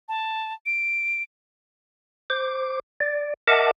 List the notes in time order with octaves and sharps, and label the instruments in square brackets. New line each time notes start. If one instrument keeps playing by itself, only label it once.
[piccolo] A5
D7
[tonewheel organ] C5 D6
D5
A#4 D#5 E5 F#5 A5 D6